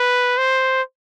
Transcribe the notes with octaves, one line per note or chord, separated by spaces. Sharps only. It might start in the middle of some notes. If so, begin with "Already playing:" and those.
Already playing: B4
C5